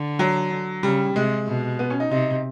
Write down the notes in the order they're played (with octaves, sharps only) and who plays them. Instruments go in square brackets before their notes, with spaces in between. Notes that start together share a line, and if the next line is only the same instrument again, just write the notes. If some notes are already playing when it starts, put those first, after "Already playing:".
Already playing: [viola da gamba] D3
[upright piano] F#3
[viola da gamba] C#3 [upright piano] G3
[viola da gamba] C3 [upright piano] G#3
[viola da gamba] B2
[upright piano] B3
C#4
D#4
[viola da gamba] C3 [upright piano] D#4